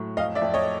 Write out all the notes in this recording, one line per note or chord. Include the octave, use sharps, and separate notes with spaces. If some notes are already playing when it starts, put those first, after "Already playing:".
Already playing: A2 F#3
F2 D#5 F5
D5 E5
F2
C#5 D#5